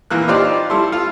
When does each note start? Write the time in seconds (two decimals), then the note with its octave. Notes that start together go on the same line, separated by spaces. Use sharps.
0.10 A#1 E3 A#3 F#6
0.28 D#4 F4 G4 C5 D5
0.70 G3 E4 A4 C6
0.92 F4